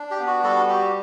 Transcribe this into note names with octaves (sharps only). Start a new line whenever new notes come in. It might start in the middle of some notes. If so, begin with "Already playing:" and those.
Already playing: D4
G4
B3
F#4
G3 F#4 A4
F#4 G4